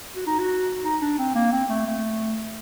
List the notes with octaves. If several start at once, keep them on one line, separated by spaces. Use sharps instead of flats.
F#4
D#4
F#4
D#4
D4
C4
A#3
C4
A3
A3